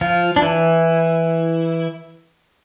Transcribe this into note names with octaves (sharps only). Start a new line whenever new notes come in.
F3 F4
D4
E3 E4